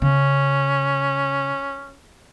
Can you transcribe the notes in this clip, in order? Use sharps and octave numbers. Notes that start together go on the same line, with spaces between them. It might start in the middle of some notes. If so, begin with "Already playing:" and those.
C#3 C#4